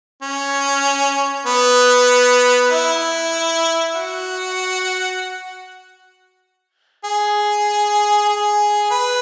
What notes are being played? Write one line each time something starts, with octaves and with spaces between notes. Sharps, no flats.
C#4
B3
E4
F#4
G#4
G#4
B4